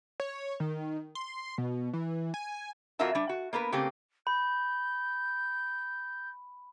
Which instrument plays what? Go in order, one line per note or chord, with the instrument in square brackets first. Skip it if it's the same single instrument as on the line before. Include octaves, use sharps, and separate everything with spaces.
[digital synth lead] C#5
D#3
C6
B2
E3
G#5
[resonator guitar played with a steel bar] F2 F4 F#4 A#4 E5 A5
G3 D4
F#4
A#3 B3 A#4 B4
C#3 A3 A#3 C4 G4
[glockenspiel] B5 [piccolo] G6